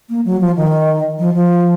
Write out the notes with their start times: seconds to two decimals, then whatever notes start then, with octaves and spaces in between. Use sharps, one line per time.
0.10 A#3
0.25 F#3
0.41 F3
0.56 D#3
1.19 F3
1.34 F3